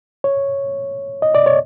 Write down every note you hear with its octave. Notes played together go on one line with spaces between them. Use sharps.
C#5
D#5
D5
C#5